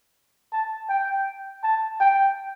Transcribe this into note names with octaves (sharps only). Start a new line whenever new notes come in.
A5
G5
A5
G5